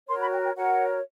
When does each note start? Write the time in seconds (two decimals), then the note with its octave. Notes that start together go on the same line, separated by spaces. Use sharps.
0.08 F#4 A#4 C#5 C6
0.20 B5
0.32 G5
0.43 G5
0.55 F#4 A#4 C#5 F#5